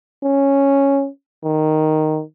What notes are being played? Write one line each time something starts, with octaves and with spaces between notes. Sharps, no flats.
C#4
D#3